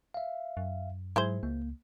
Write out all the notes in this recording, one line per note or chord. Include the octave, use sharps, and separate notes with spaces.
E5 F5
F#2
G#2 F#3 E4 G#4 C5
C#2 A#3